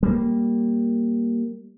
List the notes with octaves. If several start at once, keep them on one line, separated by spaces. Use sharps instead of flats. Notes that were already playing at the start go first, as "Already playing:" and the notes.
G3 A#3